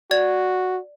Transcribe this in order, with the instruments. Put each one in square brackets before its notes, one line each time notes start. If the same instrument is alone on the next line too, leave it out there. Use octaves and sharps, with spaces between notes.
[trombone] F#4 [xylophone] D5 G#6